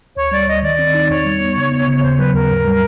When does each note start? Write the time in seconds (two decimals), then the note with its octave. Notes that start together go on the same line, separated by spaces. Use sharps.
0.16 D2 C#5
0.31 G3 D5
0.47 D2 D#5
0.62 D#3 D5
0.79 C4
0.94 D#4
1.09 E2 C#5
1.25 G3
1.41 B3
1.57 C#3
1.72 B3
1.87 C#3
2.03 D#2 C5
2.18 F#3 B4
2.34 D#2 A#4
2.49 G#2
2.65 G3